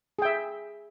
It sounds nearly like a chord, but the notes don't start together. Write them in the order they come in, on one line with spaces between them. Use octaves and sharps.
G#4 G5 E5